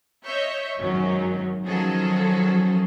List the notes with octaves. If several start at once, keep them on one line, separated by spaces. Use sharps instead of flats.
C#5 D#5 E5 C#6 G6
G#1 F#2 D#3 F#3 C#4
D#3 F3 F#3 C#4 G#4 A4